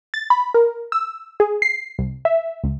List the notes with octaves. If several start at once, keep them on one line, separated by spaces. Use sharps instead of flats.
A6
B5
A#4
E6
G#4
C7
C2
E5
C#2